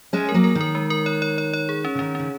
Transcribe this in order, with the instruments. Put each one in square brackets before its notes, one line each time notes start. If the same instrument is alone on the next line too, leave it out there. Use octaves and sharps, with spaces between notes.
[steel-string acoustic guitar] G#3 C#4 [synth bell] C#5
[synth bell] A#4
[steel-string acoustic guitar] F#3 A#3
[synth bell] A#4
[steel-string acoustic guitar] D#3
[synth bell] A#4
G#3
A#4
C#5
C#5
C#5
C#5
G#4
C#4
[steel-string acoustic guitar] C#3
[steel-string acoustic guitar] D#3 [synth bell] C#4
[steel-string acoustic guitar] C#3 [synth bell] C#4